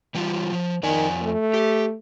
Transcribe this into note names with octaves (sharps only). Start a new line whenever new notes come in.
E3 G3 F4
F3
F2 D#3 D5 G#5
A3
G4